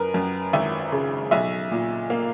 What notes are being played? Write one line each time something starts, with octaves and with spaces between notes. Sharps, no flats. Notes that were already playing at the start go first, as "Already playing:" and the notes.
Already playing: F#2 A#4 B4
F#2
G#1 E5
C#3
B1 E5
A#2
A#3 F5